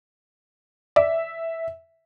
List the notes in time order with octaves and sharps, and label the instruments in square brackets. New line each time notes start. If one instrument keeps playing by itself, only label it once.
[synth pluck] D5 [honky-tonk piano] E5